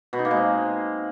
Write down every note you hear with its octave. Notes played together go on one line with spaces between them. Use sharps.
B2
D#4
A#3
G#3
C4